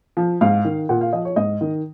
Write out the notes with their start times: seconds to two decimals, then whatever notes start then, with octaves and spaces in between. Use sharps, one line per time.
0.17 F3
0.41 G#2 F5
0.65 D#3
0.89 A#2 F#5
1.01 F5
1.13 F3 D#5
1.25 C#5
1.36 G#2 D#5
1.61 D#3